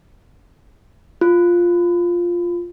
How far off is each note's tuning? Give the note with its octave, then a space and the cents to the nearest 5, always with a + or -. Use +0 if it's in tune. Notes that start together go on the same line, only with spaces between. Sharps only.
F4 +0